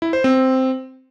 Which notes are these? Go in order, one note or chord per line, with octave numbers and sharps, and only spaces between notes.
E4
C5
C4